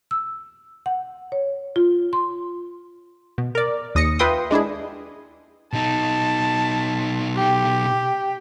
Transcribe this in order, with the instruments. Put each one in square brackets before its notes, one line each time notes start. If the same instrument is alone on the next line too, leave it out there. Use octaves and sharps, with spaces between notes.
[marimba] E6
F#5
C#5
F4
C6
[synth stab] B2
A#4 D5
D#2 D#6 A#6 C#7
F4 B4 E5 G5 C6 D#6
G#3 D4 E4 G#4
[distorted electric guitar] B2 D#4 [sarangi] A5
[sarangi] G4